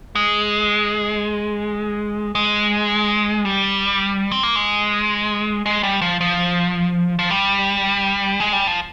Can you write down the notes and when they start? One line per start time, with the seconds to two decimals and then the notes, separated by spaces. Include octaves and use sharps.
0.15 G#3
2.35 G#3
3.45 G3
4.31 C4
4.43 A#3
4.55 G#3
5.66 G#3
5.83 G3
6.02 F3
6.21 F3
7.19 F3
7.31 G3
8.40 G#3
8.53 G3
8.67 F3